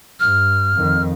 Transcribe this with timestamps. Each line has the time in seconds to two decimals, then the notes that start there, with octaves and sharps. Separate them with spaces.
0.20 G2 F6
0.77 F2 D#3